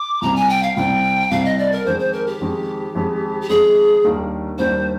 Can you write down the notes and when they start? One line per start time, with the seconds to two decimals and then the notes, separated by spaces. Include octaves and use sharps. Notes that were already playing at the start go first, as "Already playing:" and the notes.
Already playing: D6
0.22 C2 C3 G3 A#5
0.36 G#5
0.49 G5
0.63 F5
0.77 C2 C3 G3 G5
1.31 C2 C3 G3 F5
1.45 D#5
1.59 D5
1.72 A#4
1.86 F2 D#3 G#3 C5
1.99 C5
2.13 A#4
2.26 G4
2.40 F2 D#3 G#3
2.95 F2 D#3 G#3
3.41 G4
3.49 F2 D#3 G#3 G#4
4.04 D#2 D#3 G3 A#3 D4
4.58 D#2 D#3 G3 A#3 D4 C5